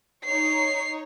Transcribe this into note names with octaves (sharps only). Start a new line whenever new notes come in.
D#4 C#5 C7